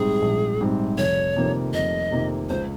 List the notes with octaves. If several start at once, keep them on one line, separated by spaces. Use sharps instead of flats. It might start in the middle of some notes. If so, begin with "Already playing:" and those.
Already playing: A#1 G#2 G3 C4 G#4
A#1
G#2 G3 C4
F1 C#5
F2 C3 D#3 A#3
F1 D#5
F2 C3 D#3 A#3
C#2 C5